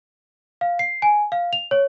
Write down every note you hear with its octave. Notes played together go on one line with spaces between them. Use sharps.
F5
C7
G#5
F5
F7
C#5